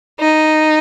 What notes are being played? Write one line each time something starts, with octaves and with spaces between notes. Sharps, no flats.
D#4